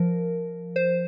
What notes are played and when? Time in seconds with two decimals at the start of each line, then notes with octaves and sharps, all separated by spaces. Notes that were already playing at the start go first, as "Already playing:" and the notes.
Already playing: F3 A#4
0.76 C5